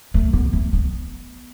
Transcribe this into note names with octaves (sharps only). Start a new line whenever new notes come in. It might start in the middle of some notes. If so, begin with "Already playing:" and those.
A3
B3
A3
B3